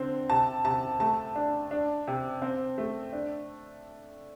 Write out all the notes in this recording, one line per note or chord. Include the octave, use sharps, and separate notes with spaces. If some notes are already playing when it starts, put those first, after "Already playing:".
Already playing: D3 C4
C3 A5
C3 A5
A3 A5
D4
D4
C3
C4
A3
D4